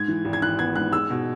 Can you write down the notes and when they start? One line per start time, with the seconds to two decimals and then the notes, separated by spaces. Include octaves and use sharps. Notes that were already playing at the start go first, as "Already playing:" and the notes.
Already playing: G#2 G#6
0.08 E3
0.25 G#1
0.33 G#6
0.42 E3 F#6
0.59 B3 G#6
0.75 G#2 F#6
0.92 G#3 E6
1.10 B2